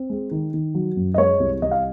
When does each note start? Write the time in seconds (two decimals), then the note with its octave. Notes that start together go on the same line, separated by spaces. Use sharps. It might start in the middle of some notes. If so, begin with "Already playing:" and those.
Already playing: C4
0.10 G#3
0.31 D#3
0.54 D#3
0.74 F#3
0.96 F#2
1.14 D#5
1.18 G#3 C#5
1.40 C2
1.62 C2 D#5
1.71 F5